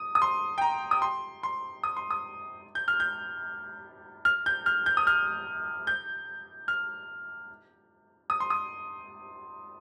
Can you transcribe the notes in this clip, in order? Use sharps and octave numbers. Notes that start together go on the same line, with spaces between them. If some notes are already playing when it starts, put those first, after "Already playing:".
Already playing: D#6
D#6
C6
G5
A#5
D#6
C6
C6
D#6
C6
D#6
G6
F6
G6
F6
G6
F6
G6
D#6
F6
G6
F6
D#6
C6
D#6